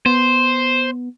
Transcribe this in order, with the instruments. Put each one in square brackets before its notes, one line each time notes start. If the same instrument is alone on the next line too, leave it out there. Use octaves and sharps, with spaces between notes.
[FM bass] B3 [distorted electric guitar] C5